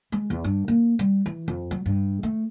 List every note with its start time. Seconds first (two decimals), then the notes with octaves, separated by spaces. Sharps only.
0.12 G#3
0.30 E2
0.44 G2
0.68 A#3
0.99 G3
1.26 E3
1.48 F2
1.71 F#3
1.86 G2
2.23 A3